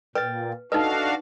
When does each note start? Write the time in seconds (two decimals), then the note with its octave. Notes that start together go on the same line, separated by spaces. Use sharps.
0.15 A#2 B4 G5 A6
0.72 D4 D#4 F#4 A4 B4 D#5 F5